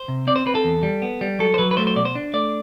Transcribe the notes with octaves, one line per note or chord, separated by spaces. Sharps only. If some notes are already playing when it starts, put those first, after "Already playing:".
Already playing: C5
C3
C4 D5
C5
C4 B4
A4
E2
G3
B3
G3
F#3 A4
C5
F#3 B4
B4
A3 C5
C5
B2 D5
C5
D4
A3 D5